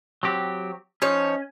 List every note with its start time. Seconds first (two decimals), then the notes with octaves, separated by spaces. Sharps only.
0.23 F#3 C4 G4
1.02 F3 C#4 D#4 C#5